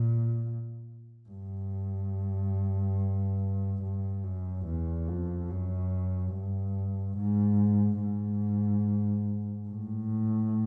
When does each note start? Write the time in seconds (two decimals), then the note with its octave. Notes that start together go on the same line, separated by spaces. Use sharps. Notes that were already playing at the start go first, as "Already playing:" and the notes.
Already playing: A#2
1.29 G2
3.82 G2
4.24 F#2
4.66 E2
5.07 F2
5.50 F#2
6.34 G2
7.17 G#2
8.02 G#2
9.69 A2